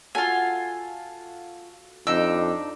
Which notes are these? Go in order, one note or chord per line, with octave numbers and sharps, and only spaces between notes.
F4 F#4 A4 F5 G#5
F2 D4 D#4 E6